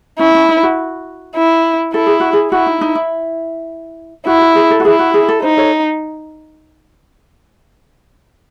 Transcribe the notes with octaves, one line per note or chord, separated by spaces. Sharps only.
C#4 E4
C#4
D#4
F#4
E4
E4 A4
G#4
F#4
G#4
E4 F#4
D#4
D#4
E4
E4 F#4
F#4
G#4
A4
F#4
E4 G#4
F#4
G#4
A4
D#4 C5
A4 C#5